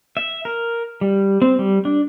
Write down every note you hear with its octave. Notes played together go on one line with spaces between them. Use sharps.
E5
A#4
G3
C4
G3
D4